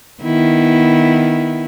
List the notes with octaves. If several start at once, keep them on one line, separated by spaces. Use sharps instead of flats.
D#3 B3 E4